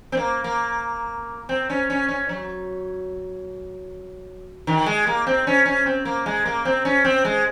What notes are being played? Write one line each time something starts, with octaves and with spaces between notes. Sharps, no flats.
C4
A#3
A#3
C4
C#4
C#4
C#4
F#3
D#3
G#3
A#3
C4
C#4
C#4
C4
A#3
G#3
A#3
C4
C#4
C4
G#3